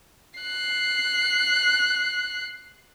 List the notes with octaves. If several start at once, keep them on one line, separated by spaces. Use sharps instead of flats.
F#6 C7